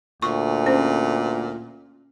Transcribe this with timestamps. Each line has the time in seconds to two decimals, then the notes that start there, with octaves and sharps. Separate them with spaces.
0.22 D2 A#2 C#6
0.66 C#4 C5